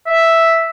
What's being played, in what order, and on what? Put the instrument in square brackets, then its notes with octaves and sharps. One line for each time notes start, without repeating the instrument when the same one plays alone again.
[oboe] E5